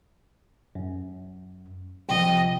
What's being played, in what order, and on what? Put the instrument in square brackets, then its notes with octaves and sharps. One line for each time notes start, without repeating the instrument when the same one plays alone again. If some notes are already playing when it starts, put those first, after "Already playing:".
[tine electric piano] F#2
[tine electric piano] A1 C3 F3 [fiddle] D#5 [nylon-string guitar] G5